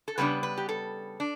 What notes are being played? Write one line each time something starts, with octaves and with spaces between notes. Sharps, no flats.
A4
C#3 G3 B3 D4 B4
B4
G4
A4
D4